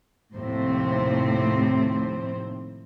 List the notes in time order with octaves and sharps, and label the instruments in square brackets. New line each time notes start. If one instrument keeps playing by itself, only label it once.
[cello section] D#2 A2 C3 F3 C4 C5